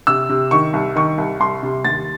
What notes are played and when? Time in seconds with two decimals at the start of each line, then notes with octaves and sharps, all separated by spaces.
0.07 C3 E6
0.29 C3
0.51 D#3 C#6
0.73 C2
0.96 D#3 C#6
1.18 C2
1.40 C2 C6
1.63 C3
1.84 D#2 A6